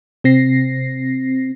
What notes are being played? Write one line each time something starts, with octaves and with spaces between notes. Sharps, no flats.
C3 C4 A#6 C7